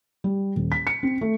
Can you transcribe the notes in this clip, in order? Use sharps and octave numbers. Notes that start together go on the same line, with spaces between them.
G3
D#1
B6
C#7
C4
A3